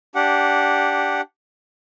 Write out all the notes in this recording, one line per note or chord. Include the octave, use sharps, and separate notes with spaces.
D4 G4 F#5